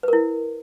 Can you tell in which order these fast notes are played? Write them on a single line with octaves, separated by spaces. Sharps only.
B4 A#4 E4